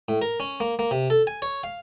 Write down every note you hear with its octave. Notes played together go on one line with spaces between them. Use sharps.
A2
A#4
C#4
A#3
A#3
C3
A4
G#5
C#5
F5